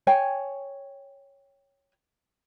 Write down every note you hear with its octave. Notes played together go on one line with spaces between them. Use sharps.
C#5 G5 G#5